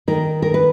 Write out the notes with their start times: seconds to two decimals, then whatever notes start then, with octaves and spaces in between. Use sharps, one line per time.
0.08 D#3 A#4
0.42 A#4
0.54 B4